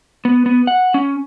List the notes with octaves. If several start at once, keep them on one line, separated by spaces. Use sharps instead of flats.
B3
B3
F#5
C#4